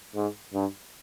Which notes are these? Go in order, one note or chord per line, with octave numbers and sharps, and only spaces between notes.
G#2
G2